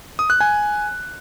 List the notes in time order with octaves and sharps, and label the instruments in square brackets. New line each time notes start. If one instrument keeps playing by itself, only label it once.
[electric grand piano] D#6
F#6
G#5